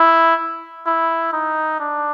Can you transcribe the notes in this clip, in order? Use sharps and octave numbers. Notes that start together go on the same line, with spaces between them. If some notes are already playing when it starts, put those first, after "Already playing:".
Already playing: E4
E4
D#4
D4